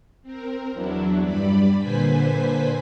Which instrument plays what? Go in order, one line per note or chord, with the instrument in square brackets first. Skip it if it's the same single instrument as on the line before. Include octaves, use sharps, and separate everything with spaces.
[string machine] C4 A#4
E2 F#3 D4 E4
G2 G3 D5 B5
A#2 D3 B4 C5 G#5 B6